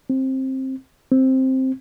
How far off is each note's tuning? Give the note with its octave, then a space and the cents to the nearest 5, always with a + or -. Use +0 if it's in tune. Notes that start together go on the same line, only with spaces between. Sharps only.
C4 +15
C4 +5